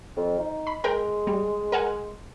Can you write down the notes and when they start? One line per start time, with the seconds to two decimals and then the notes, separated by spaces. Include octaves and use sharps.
0.17 F2
0.39 D#4
0.67 B5
0.84 G#3 A#4 G5 A#5
1.27 G3
1.72 A#4 F#5 G#5